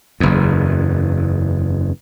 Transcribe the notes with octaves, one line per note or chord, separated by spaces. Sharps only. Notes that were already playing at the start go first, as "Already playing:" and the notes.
F#1 E2